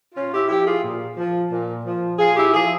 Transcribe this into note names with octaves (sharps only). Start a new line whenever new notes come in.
A#2 C#4 F4
E4 G4
F3 E4 G4
F4 G#4
A#2
F3
A#2
F3
A#2 F4 G#4
E4 G4
F3 F4 G#4